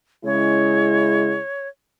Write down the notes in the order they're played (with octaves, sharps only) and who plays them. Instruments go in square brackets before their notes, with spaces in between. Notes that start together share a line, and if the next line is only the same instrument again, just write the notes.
[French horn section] C#3 G#3 E4 [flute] C#5